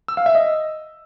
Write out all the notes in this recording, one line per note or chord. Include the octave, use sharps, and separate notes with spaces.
E6
F5
E5
D#5